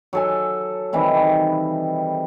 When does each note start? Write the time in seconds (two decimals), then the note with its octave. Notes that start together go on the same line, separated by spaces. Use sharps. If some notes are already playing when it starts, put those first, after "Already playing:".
0.13 F#3 A4 G#5
0.93 C3 D#3 E3 G3